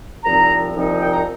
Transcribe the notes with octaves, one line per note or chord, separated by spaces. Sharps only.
C2 A#2 F3 C4 D#4 A#5
C2 A#2 F3 C4 D#4
G5
A#5